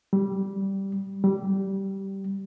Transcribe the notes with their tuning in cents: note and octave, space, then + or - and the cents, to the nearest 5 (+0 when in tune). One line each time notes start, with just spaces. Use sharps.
G3 -10
G3 -15